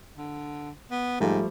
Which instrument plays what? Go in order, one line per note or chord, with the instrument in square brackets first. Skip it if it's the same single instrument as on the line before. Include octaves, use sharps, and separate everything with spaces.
[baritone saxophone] D3
B3
[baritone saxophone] G#2 [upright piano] F3 G3 A3